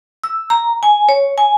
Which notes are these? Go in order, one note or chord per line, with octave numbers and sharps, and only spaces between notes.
E6
A#5
G#5
C#5
G#5